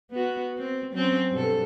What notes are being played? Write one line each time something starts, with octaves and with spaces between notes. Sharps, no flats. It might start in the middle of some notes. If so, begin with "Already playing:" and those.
B3 F#4
C4
F#3 C4 C#4
G2 B2 A4